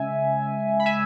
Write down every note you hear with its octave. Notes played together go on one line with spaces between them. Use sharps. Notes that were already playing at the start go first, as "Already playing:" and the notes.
Already playing: C#3 G#3 E5 G#5
B5
E5 G#5